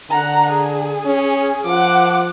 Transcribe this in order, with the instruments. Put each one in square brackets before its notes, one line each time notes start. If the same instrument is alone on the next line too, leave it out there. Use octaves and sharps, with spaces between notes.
[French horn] D3 [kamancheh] F#5 A#5
[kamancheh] G#4
[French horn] C#4
[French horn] F3 [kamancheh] F#5 D6